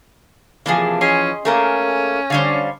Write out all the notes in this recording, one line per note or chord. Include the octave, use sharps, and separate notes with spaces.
C3 E3 F3 A#3 D4 G#4
C#4 G#4 D#5 C6
A3 A#3 C#4 G#4 A#4
D3 G3 C5 C#5 F5